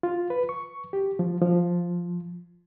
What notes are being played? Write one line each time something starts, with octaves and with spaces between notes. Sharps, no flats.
F4
B4
C#6
G4
F3
F3